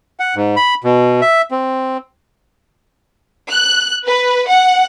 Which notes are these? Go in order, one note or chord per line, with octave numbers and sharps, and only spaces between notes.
F#5
G#2
B5
B2
E5
C4
F#6
B4
F#5